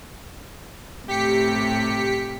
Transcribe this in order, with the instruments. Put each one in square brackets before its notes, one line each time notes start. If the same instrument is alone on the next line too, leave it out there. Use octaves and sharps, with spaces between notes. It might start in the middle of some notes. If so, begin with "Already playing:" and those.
[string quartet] A2 C3 [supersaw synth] G4 B6 C#7